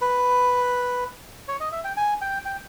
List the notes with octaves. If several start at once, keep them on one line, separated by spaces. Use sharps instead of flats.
B4
C#5
D#5
E5
G5
G#5
G5
G5